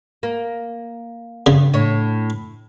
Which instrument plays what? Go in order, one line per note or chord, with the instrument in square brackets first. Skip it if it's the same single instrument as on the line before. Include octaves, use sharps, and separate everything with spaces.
[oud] A#3
[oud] G2 [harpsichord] C#3
[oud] A2 C#5